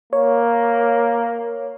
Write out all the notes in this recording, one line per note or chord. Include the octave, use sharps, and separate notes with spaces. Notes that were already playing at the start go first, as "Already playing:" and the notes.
A#3 C#5